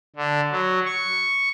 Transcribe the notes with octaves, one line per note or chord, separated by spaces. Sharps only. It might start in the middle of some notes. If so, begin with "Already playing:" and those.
D3
F#3
C#6